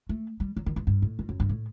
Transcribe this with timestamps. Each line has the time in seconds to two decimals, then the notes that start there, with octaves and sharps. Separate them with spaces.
0.09 A3
0.40 G3
0.57 F#3
0.66 D#3
0.76 G2
0.87 G2
1.02 A2
1.19 G2
1.29 F#2
1.40 G2
1.49 A2